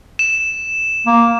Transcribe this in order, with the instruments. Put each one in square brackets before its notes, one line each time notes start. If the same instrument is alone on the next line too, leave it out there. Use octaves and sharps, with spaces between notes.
[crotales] E7
[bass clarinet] A#3